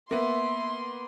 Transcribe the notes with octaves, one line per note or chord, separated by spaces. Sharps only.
A#3 B3 E5 C6